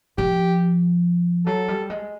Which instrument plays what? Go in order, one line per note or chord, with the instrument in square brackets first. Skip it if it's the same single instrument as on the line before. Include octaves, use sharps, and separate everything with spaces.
[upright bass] F3 [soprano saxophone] G4
[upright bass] F#3 [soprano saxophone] A4
[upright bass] G3
G#3